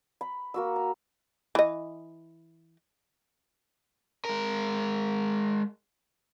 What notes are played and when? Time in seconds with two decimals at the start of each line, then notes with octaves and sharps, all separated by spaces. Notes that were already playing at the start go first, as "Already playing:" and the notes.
0.21 B5
0.54 A#3 F#4 E6
0.76 A#5
1.55 E3 D#5
4.25 G#3 A#4